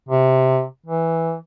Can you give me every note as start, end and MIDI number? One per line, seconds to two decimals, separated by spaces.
0.08 0.65 48
0.86 1.36 52